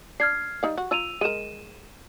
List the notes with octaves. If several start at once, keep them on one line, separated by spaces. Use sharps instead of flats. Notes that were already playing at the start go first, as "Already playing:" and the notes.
D4 F6 G#6 C7
G3 D#4 F5
F#4
F4 C#5 A#5 E6 D#7 F7
G#3 A#4 D#7 E7